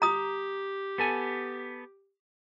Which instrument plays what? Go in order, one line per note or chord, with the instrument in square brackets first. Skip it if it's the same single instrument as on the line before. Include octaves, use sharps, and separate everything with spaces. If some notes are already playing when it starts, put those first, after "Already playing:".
[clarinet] G4 [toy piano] A#5 D#6
[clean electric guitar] B3 A4 G#5